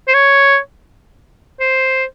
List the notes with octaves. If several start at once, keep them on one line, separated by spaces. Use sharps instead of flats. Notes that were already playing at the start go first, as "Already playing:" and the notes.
C5
C#5
C5